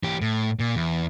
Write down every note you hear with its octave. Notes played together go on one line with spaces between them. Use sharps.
E3 G4
A2
A#2
E2